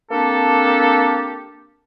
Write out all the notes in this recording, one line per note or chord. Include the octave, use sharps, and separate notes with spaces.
A#3 C4 D4 G4 A4